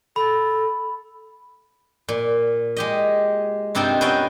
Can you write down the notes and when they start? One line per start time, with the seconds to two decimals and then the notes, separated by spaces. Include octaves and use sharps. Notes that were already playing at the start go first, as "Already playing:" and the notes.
0.16 A4 B5
2.08 A#2
2.76 G#3 G4 D#5
3.75 G2 C3 C4 D#4 F4 G5
4.01 B3 C#4 C5 D#5 G5